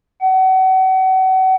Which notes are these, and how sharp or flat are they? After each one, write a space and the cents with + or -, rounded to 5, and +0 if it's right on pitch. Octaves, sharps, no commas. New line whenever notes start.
F#5 +35